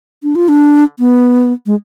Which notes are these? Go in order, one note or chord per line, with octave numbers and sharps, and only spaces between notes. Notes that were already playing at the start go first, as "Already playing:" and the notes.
D4
F4
D4
B3
G#3